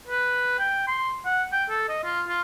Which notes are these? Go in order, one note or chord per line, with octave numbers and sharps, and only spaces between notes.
B4
G5
C6
F#5
G5
A4
D#5
F4
F4